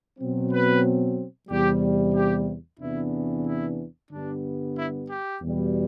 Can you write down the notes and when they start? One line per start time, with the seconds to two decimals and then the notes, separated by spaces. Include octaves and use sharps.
0.19 B2 F#3 C4
0.51 B4
1.49 E2 C3 G3 G4
2.15 G4
2.80 E2 C3 E3 B3 D4 E4
3.46 E4
4.11 G2 D3 G3 B3 D4
4.76 E4
5.09 G4
5.42 E2 B2 G3